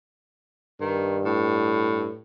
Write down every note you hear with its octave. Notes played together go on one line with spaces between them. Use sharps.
G2 D#3
A2